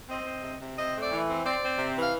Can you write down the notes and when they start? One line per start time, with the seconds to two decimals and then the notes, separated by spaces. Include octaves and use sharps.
0.09 C4 D#5
0.26 C4
0.43 C3
0.61 C3
0.78 C4 D#5
0.95 A3
1.00 D5
1.12 E3
1.28 C4
1.45 C4 D5
1.62 C4
1.79 C3
1.96 E3 F5